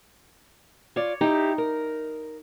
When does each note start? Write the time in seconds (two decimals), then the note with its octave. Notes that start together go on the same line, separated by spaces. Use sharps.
0.96 F4 C#5 D5
1.21 D#4 E4 G4
1.58 A#4